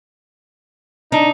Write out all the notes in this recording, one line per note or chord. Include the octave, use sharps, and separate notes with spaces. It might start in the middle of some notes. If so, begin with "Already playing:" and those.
D4 D#4